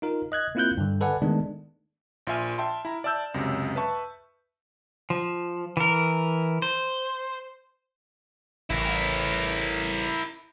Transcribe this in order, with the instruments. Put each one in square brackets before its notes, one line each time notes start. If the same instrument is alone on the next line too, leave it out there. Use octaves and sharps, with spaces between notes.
[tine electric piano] D#4 F4 A#4
D#5 F#6 G#6
A#3 C4 E4 F4 F#6 G6
G2 D3
A4 B4 D5 F#5 G#5
D#3 G#3 A3 B3 D4
[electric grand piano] A#1 F4 E5 G#5 F6
E5 G5 A5 C6
E4 A#5
D5 E5 A5 E6 G6
C#2 F#2 C3
B4 E5 A5 C#6
[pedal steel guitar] F3
E3 A#4
C5
[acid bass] A1 [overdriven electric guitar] E4 A#4